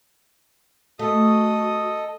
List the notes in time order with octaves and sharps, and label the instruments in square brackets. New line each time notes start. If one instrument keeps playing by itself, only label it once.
[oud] A3 [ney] F#4 [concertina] A4 D#5 [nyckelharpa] D#6